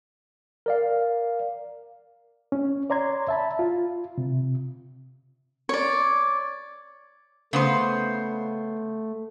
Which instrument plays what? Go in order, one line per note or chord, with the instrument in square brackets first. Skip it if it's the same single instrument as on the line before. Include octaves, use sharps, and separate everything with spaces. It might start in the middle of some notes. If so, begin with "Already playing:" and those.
[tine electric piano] A#4 D5 F5
[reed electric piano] C#4
C#5 D5 A#5 C6 G#6
E5 A5 B5
F4
C3
[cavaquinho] C#5 D5
[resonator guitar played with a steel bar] C#3 B3 C5 [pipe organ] A3